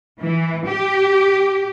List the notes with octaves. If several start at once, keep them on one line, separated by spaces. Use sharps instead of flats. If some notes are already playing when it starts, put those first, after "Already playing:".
E3
G4